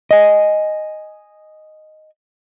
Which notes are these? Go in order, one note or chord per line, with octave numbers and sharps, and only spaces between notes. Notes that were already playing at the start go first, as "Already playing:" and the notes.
D#5 G#5